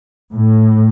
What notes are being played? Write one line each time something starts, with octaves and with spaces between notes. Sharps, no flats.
A2